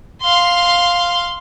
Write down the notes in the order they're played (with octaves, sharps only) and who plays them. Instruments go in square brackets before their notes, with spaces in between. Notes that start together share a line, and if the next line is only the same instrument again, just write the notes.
[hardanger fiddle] F5 C6